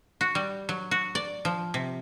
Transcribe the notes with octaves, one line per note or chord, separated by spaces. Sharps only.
F#4
G3
F#3
F#4
D5
F3
C3